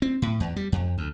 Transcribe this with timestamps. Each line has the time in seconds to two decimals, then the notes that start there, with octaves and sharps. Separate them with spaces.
0.02 C4
0.22 A2
0.40 E2
0.56 G3
0.72 F2
0.98 D2